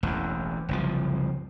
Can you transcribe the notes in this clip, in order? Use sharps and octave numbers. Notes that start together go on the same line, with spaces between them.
E1 A1 E2
F#1 C2 F3